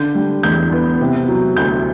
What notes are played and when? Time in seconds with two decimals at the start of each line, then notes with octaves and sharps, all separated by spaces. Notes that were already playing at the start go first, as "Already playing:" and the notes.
Already playing: D3 G6
0.15 G3
0.43 E2 G6
0.72 B3
1.01 C3
1.28 F#3
1.56 D2 G6